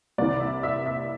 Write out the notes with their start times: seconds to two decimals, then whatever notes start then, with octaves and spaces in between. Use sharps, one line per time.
0.18 C2 C3 E3 D5
0.40 E5
0.63 E5
0.86 E5